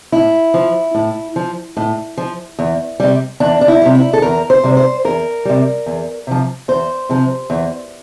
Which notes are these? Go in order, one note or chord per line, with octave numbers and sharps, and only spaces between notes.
A2 E4
F3
A2
F3
A2
F3
E2
C3 G3
E2 D4
D4
E4
C3 G3
E4
A4
E2 A#4
C5
C3 G3
C5
E2 A#4
C3 G3
E2
C3 F3
E2 C5
C3 F3
E2